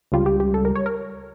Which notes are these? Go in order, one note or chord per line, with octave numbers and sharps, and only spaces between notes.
C#2 C#3 G3 F4
G4
G4
A4
A#4
C#5
A#4